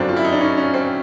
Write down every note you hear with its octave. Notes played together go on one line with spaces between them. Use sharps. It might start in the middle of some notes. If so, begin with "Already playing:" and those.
Already playing: G1 F#2 D3 F#3 C4 D4
F4
E4
D#4
D4
C#4
C#4
C4